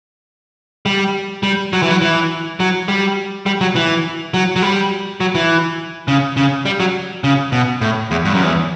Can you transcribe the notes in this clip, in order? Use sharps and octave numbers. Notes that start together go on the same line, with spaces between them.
G3
G3
F#3
E3
F#3
E3
F#3
G3
G3
F#3
E3
F#3
F#3
G3
F#3
E3
C#3
C#3
G3
F#3
C#3
B2
A2
E2
G2
F#2
E2